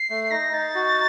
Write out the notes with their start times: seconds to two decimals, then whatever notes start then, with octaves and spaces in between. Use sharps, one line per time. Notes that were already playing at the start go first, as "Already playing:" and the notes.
Already playing: C7
0.10 A3
0.31 D#4 A#6
0.53 D#4 A6
0.75 F#4